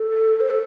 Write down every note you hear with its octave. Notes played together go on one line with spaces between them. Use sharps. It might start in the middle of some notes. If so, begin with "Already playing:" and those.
Already playing: A4
C5
A4